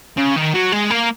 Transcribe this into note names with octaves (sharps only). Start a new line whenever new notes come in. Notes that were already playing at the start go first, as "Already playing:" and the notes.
C#3
D#3
F#3
G#3
A#3